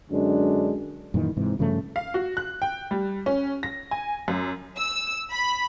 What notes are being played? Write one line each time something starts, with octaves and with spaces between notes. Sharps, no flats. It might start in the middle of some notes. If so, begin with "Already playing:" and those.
F#2 D3 G#3 D4
F#2 A#2 D#3 E3
G#2 C3 E3
G2 C#3 F3 A3
F5
F#4
F#6
G5
G3
C#4
A#6
G#5
F#2
E6
B5